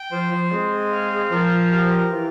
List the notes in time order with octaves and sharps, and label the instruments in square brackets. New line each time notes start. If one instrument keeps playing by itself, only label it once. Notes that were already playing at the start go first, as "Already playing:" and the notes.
Already playing: [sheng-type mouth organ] G5
[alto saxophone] F3 [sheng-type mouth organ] C5
[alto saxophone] F3
[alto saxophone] G#3 [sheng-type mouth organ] C4
[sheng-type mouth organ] F5
[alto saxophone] F3 [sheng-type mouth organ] A#4
[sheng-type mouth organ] G4
[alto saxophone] E3 [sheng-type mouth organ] F4